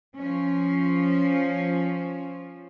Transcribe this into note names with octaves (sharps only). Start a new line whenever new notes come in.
F3 C#4